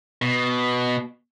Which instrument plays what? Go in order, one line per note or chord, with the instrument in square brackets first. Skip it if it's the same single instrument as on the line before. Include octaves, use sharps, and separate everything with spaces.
[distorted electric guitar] B2